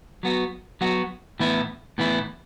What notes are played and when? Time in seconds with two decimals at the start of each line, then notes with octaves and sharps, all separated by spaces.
0.23 F#3 B3 F#4
0.81 F#3 B3 F#4
1.40 A2 E3 B3 E4
1.98 A2 E3 B3 E4